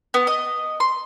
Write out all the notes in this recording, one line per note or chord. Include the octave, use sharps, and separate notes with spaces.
B3
D#5
C6